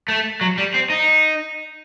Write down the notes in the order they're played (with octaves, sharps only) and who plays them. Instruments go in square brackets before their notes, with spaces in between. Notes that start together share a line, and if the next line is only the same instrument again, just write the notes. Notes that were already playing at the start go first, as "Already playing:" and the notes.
[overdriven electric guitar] A3
F#3
G3
C4
D#4